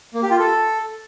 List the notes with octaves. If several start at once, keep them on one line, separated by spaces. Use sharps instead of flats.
A#3
G4
F4
A4